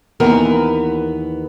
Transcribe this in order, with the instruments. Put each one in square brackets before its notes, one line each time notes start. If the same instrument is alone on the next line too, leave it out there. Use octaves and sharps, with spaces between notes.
[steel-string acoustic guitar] D#2 E3 B3 A#4